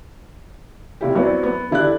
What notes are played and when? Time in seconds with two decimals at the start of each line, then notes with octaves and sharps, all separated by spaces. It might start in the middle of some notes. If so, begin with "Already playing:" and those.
1.01 C3 E4 G4
1.15 F#3 B3 C4 E4 D5
1.43 B3
1.71 D3 E4 G4 D5 F#6